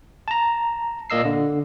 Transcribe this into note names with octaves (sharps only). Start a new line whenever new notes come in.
A5 A#5
A#2 A#3 D#5 E6 C7
D3